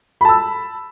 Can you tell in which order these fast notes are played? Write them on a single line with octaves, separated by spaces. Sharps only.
B5 A5 E6